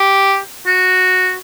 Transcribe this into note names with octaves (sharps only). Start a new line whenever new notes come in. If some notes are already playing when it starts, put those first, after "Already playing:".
Already playing: G4
F#4